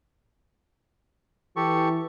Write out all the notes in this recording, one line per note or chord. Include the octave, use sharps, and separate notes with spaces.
E3 G4 A4 C#6